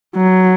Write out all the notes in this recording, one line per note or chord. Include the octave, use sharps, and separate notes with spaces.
F#3